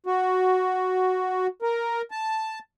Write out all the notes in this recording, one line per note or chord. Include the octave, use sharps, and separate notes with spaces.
F#4
A#4
A5